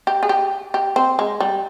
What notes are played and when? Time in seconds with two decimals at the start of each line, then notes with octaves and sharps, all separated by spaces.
0.07 G4
0.23 G#4
0.29 G4
0.74 G4
0.96 C4
1.19 G#3
1.40 G3